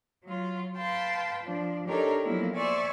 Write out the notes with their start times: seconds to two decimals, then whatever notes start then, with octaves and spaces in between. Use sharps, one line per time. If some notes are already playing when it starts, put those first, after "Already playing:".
0.24 F#3 F4
0.77 B4 F5 G5 A5 C6
1.43 F3 D4
1.86 D4 D#4 G4 A4 A#4 C#5
2.24 F3 F#3 A#3 B3 E4
2.54 C5 D5 E5 G#5 C#6